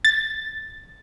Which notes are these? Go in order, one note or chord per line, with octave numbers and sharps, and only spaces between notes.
A6